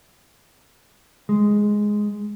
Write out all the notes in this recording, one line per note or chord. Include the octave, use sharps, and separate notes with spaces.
G#3